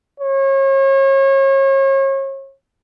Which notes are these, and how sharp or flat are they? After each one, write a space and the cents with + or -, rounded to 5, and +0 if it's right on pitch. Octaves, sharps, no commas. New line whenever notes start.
C#5 -35